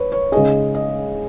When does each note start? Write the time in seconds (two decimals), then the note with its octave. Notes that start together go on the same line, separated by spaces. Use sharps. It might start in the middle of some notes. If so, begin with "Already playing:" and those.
Already playing: B4 C#5
0.12 C#5
0.32 C#3 G#3 D#4 G#4 D#5
0.75 D#5